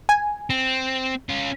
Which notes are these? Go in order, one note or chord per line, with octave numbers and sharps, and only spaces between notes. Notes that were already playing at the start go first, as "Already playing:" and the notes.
G#5
C4
C#4 F4